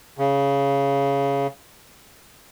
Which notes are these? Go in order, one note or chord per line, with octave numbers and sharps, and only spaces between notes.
C#3